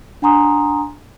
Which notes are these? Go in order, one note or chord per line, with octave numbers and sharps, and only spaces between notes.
D4 F#5 G#5 A#5 C6 D#6